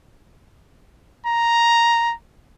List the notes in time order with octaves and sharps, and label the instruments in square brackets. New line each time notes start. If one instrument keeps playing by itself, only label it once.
[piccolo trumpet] A#5